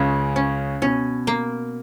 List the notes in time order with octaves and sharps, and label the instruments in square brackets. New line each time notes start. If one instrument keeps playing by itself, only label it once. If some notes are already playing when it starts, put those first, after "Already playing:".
Already playing: [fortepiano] C#2 C#3 [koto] C#4
[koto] C#4
[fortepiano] B2 [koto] C#4
[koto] A#3